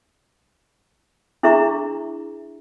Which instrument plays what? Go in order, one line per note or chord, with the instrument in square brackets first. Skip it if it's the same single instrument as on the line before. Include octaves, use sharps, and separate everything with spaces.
[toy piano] D4 E4 G#4 E5 A#5 C#6